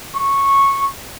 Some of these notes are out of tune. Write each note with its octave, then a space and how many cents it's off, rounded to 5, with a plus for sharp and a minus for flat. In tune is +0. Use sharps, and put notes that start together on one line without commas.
C#6 -10